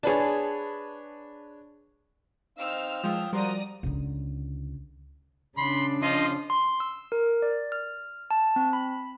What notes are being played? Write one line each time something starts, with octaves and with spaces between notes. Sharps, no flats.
D4 G#4 B4 C#5 A5
C4 D#4 F5 E6 F6
F3 G#3 F4 G5 D#6
F3 G3 F#4 A#4 C5 D5 A#5 D#6
C#2 D3
C#3 D4 B5 C6
F3 F4 D#5 C6
C6
E6
A#4
D5
F6
A5
C4
B5